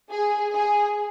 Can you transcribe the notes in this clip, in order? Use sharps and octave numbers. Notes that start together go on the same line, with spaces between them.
G#4
G#4